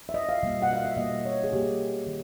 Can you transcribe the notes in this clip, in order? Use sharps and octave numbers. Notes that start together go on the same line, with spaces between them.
E5
D#5
F5
B2 G3 A#3
F#5
F5
E5
B2 G3 A#3 D#5
C#5
G#4
B2 G3 A#3 G4
D#3